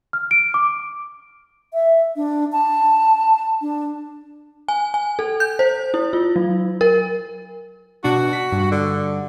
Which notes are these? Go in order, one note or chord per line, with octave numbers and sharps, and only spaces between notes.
F6
D7
D6
E5
D4
A5
D4
G#5
G#5
A4
G6
C5
E4
F4
F#3
A#4
B2 D4 F#4
B6
G2
D3